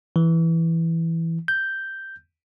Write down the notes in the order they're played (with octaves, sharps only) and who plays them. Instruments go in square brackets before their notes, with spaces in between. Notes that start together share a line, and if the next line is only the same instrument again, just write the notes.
[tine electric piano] E3
G6